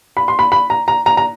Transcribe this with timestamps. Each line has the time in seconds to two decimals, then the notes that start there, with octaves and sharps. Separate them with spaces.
0.17 B5
0.28 C6
0.39 B5
0.52 B5
0.70 A#5
0.88 A#5
1.06 A#5
1.17 A#5